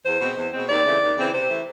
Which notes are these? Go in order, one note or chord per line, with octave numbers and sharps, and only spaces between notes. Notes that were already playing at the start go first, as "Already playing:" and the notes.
E2 C5
B2 G#3 C4
E2
B2 G#3 C4
D#2 D5
C#3 E3 A3 C4
D#2
C#3 E3 A3 C4
C3 C5
E3 A3